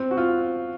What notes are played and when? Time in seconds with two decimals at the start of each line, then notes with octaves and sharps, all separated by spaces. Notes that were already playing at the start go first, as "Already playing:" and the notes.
Already playing: C4
0.11 F#4
0.17 F4